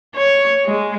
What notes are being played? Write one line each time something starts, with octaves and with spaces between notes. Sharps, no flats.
C#5
G#3